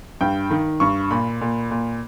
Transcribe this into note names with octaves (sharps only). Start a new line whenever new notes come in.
G2 G5
D#3
G2 C#6
A#2 B5
A#2
A#2